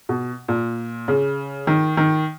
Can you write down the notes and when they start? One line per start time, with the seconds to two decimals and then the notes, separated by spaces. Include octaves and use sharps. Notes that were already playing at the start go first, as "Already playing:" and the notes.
0.09 B2
0.49 A#2
1.08 C#3
1.67 D#3
1.97 D#3